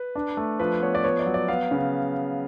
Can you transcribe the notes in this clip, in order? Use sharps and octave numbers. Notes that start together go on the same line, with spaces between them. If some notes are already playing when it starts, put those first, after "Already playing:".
Already playing: B4
D4
A3
F3 B4
B3 C#5
D5
B3 C#5
D5
F#3
D5
B3 F5
C#3